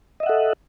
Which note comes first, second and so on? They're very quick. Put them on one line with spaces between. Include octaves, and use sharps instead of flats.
D#5 E5 F#5 A4